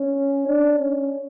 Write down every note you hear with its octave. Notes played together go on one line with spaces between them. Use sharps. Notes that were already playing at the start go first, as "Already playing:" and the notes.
Already playing: C#4
D4
C#4